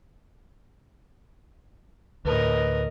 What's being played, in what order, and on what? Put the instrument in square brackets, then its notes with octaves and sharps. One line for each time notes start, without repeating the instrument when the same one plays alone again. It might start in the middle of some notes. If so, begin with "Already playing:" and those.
[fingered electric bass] D2 [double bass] A2 [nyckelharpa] A#4 D#5 [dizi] B4